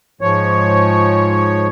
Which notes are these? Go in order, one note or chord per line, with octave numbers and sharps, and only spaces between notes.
G#2 F3 C#5